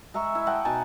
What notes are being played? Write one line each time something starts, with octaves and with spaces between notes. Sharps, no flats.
G#3 E5 A#5 C#6
E4
D#5 F#5 G5 A5
B2 D#4 G#5 A5